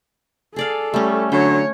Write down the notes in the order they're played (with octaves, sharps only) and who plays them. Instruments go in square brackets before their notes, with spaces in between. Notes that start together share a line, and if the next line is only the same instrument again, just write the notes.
[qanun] G#4 D5 F5 [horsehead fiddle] A4
[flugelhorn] G3 [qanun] A3 C#4
[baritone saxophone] D3 [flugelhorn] F#3 [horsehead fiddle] C#5 [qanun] G5